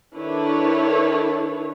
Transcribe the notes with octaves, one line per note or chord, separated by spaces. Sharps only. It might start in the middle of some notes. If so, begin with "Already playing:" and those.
D#3 D4 E4 A4 B4 C#5